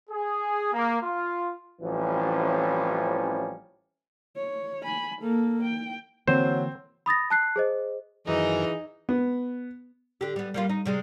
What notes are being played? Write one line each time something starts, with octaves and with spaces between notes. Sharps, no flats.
G#4
A#3
F4
A1 E3 F3 G3 C4 C#4
C#5
G#5 B5
A#3 A4
G5
D3 E3 F#3 A#3 C4 C5
B5 D#6 A6 A#6
A5 F#6 C7
G#4 C5 D#5
F#2 D#3 E3 D#4 G#4 A#4
B3
D3 G4
G3 B3
G3 A#3 F4
D#4
C3 G3 G#3